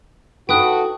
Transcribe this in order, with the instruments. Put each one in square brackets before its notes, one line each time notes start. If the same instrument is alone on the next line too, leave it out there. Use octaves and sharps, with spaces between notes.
[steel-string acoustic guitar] D#4 A4 B4 [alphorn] F#4 [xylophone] G5 D#6 F#6